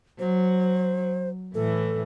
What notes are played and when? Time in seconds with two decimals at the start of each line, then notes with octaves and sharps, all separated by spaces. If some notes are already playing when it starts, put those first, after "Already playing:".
0.19 F#3 C5
1.54 A2 E3 A4